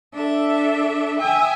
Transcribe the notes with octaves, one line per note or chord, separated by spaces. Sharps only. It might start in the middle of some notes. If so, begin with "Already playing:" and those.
D4 A4 E5
E5 G5 G#5 D#6